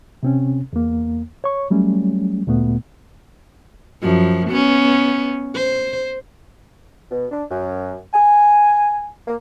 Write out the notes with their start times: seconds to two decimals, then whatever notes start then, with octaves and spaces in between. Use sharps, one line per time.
0.23 C3 C4 C#4
0.73 E2 A#3
1.44 C#5 C#6
1.70 F#3 G3 A3 C#4
2.47 D2 A#2 A3 B3
4.02 F#2 F3
4.50 B3 C#4
5.55 C5
7.10 B2
7.30 D4
7.50 F#2
8.13 G#5
9.27 A#3